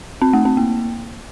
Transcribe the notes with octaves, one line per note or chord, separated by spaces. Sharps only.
C4
A3
C4
A#3